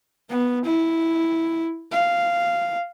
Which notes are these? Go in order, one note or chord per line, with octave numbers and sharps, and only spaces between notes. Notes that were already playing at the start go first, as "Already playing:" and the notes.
B3
E4
F5